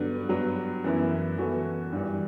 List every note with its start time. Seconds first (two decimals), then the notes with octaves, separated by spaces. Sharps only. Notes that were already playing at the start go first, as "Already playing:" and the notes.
Already playing: G2 D3 F#3 B3 D4
0.29 G2 F#3 B3
0.84 F#2 E3 B3 E4
1.38 E3 B3 F#4 A4
1.92 G2 E3 G3